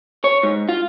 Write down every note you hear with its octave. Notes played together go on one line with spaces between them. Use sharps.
C#5
G#2
F4